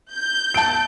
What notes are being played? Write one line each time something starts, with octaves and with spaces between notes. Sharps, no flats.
G6
A5 D7